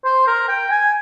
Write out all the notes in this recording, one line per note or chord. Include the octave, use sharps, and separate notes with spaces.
C5
A#4
G5
G#5